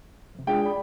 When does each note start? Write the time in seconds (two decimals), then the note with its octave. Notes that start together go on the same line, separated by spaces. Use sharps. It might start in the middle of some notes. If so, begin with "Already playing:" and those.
0.35 F2 C3
0.47 G#3 D4 F4 G#4 G5
0.65 D5 B5